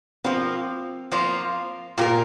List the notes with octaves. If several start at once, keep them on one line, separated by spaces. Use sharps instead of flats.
F3 A#3 C4 F4
F3 A#3 F4
A#2 A#3 F4 G4 A#4